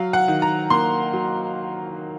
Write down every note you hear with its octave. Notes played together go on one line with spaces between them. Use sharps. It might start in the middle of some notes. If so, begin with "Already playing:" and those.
Already playing: F#3 F5
F#5
D#3
A#5
A#3 C6
F#3